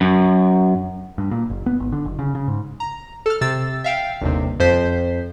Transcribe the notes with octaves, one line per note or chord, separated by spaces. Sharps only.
F#2
G2
A#2
F#1
B3
G#1
D3
F#1
C#3
C#3
G#2
A#5
A4 F6
C3 E6 A6
E5 F5 G5
G1 D#2 C3
F2 C5 B6